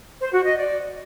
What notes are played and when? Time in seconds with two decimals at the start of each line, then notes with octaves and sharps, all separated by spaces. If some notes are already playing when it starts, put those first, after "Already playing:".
0.20 C5
0.32 F#4
0.44 D#5
0.56 D5